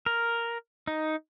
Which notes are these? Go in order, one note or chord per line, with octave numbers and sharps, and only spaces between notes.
A#4
D#4